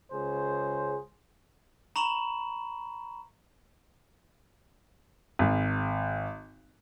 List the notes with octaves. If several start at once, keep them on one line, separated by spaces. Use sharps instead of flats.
C#2 C#3 G#4 C5
A#5 B5 C#6 E7 F#7
G#1